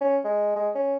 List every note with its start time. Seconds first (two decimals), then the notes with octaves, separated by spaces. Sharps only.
0.01 C#4
0.24 G#3
0.56 G#3
0.75 C#4